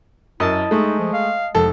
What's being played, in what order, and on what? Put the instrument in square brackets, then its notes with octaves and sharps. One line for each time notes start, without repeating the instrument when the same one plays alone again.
[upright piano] F#2 [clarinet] E4 [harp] D#5 A5
[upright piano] G#3 A3 [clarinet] D#4
[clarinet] F3
F5
[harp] F1 [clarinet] G#3 [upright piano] A4